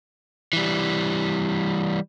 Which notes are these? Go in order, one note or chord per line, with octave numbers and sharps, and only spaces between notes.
E3 G3